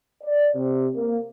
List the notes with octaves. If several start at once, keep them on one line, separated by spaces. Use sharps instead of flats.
D5
C3
A#3